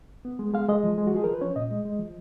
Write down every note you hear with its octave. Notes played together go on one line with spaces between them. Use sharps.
B3
G#3
G#3 F5
G#3 D#5
F3
G#3
F#4
F3 G#4
F3 A#4
B4
C#4 C#5
A#2 D#5
G#3
G#3
F3